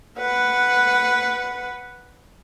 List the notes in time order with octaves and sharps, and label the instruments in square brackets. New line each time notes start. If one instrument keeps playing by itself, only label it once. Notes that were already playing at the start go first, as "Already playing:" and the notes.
[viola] B4 F#5